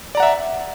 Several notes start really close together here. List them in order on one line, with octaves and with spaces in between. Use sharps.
D5 A#5 F#5 E5